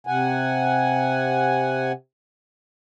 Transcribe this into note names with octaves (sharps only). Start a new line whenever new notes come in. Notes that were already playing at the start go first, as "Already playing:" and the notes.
C3 F#5 G#5